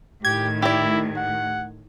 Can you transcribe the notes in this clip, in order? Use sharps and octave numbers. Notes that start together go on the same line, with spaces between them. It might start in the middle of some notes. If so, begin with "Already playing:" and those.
A2 D#3 G4 G#6
E4 G4 D5
F#5